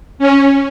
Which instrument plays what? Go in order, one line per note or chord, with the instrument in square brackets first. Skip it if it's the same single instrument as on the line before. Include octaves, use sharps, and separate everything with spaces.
[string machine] C#4